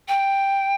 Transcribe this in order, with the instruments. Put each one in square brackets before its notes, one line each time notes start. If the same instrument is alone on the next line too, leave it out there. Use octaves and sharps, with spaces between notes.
[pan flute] G5